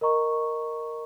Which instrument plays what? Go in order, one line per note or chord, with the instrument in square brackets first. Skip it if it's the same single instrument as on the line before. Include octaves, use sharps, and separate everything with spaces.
[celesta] A#4 D#5 A#5 C#6